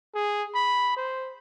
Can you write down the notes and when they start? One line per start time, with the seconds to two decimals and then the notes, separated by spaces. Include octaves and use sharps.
0.15 G#4
0.55 B5
0.97 C5